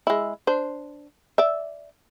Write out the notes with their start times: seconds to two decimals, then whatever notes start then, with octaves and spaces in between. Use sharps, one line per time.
0.07 G#3 E4
0.47 D4 C5
1.38 D5 E5